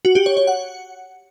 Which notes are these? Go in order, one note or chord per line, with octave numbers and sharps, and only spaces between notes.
F#4
G4
C#5
C#5
F#5